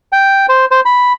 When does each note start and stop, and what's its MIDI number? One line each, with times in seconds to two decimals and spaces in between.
0.12 0.46 79
0.49 0.65 72
0.71 0.80 72
0.85 1.13 83